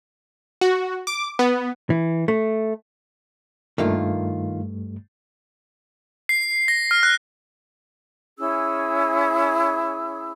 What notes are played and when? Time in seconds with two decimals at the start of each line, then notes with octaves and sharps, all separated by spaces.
0.61 F#4
1.07 D6
1.39 B3
1.90 E3
2.28 A3
3.78 G2 D#3 G3 A3 A#3 F4
6.29 C7
6.68 A#6
6.91 F6
7.03 F#6
8.38 C#4 E4 G#4 E6